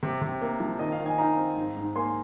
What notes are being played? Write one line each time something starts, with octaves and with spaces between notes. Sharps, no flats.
C3
C3
A#3
F3
D#3 D#5
F5
D#3
D#5 G#5
D#4 F5 A#5
C4
G#2
G#2
A#3 G#5 C6